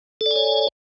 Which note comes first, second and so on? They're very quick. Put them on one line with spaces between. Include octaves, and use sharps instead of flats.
A4 D5 G#5 C#5